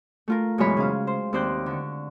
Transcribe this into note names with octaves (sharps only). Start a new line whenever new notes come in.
A3 F4 A#4
F#2 B2 E3 G#3 C#5 B5
C#3 G#4 C5 F5
C5
D#2 C4 C5 D5 F#6 G6
D3 C#6